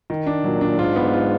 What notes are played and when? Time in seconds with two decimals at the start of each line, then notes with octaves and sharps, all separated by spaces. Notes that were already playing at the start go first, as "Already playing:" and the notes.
0.10 D#3
0.27 D4
0.44 A#2 F#3
0.61 D4
0.79 G#2 F4
0.96 B3
1.13 F4